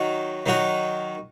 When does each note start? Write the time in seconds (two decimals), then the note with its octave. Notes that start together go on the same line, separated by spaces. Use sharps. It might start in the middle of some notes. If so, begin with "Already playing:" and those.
Already playing: D#3 F#3 D#4 F#4
0.46 D#3 F#3 D#4 F#4